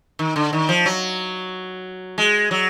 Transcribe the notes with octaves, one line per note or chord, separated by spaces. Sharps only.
D#3
D3
D#3
F3
F#3
G#3
F#3